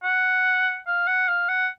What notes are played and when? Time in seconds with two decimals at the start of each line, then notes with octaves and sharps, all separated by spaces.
0.04 F#5
0.87 F5
1.08 F#5
1.28 F5
1.49 F#5